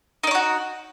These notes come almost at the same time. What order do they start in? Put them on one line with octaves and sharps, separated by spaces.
D#4 D5 C#5 F#4